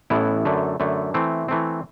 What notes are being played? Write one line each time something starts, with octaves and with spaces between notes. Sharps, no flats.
A1 A2 E3 B3 E4
F#2 D3 A3
F#2 D3 A3
E3 A3 C4
E3 A3 C4